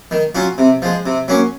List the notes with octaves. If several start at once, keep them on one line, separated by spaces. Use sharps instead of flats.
D#3
F#3 C#4 F4
C3
F3 G#3
C3
F#3 A#3 C#4